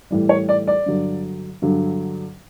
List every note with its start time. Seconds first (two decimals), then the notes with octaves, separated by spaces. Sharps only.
0.11 A2 E3 G3
0.29 C#5
0.49 D5
0.67 D5
0.86 G2 D3 F#3
1.62 G2 D3 F#3